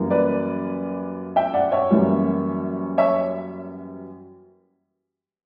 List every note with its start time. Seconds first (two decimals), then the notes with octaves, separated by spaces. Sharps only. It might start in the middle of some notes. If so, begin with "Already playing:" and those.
Already playing: F#2 E3 G3 A#3
0.10 B4 D5
1.36 E5 G5
1.54 D5 F#5
1.72 C#5 E5
1.90 F#2 E3 G3 A#3
2.98 C#5 E5